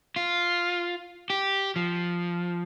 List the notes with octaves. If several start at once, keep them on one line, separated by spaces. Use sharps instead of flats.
F4
G4
F3